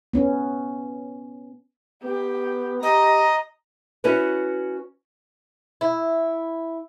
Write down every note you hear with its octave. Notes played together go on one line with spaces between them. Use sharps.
B3 C#4
B3 G4
G4 D#5 A#5
C#4 E4 F#4 B4 C#5
E4